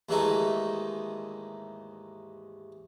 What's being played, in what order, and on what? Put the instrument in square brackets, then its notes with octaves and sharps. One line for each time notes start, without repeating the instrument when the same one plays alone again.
[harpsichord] D#2 G#2 E3 A3 D#4